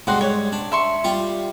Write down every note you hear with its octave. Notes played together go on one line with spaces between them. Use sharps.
G#2 G3 F#4 F#5 C6
C#5
D4
E5 C6 C#6
G3 F4